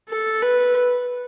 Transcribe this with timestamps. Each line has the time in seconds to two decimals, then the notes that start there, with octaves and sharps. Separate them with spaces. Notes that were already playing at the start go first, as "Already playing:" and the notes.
0.09 A4
0.42 B4